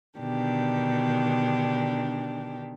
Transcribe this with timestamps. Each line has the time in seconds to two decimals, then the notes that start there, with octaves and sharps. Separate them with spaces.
0.19 B2 D3 D#3 D4 G4